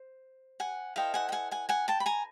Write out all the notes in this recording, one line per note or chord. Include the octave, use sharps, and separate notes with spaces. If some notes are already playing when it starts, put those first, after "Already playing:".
Already playing: C5
F#5 G#5
E4 A4 C5 D#5 F5 G5
F#5 G#5
G5
F#5 G#5
F#5 G#5
F#5 G#5
G5 A5
B5
G#5 A#5